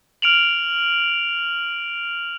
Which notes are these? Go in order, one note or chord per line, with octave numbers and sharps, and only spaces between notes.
F6 D7 F7 F#7